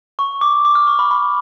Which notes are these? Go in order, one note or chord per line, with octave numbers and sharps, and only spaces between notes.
C#6
D6
D6
F6
C#6
B5
B5